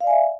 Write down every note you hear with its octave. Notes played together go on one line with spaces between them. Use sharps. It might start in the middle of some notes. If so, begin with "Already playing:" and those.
D5 E5 F5 G#5